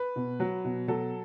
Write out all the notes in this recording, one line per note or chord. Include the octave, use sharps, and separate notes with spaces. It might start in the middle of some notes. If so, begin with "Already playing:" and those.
Already playing: B4
B2
F#3
B2
F#3 A4